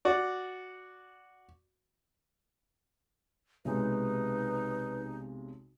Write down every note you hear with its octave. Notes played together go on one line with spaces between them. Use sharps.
F#4 D5
B1 C3 G#3 D#4 B4